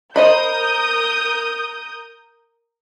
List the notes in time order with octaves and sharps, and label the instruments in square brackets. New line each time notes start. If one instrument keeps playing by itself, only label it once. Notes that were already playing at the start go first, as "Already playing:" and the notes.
[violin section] A#4 D#6 G6 [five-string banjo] C5 D#5 B5